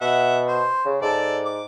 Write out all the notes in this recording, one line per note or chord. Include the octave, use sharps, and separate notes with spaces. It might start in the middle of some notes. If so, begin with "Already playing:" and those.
B2 E5 F#5
C5
C#3
G#2 A4 D5
D6